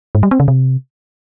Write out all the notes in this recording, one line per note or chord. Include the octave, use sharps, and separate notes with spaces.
G#2
G3
C4
C#3
C3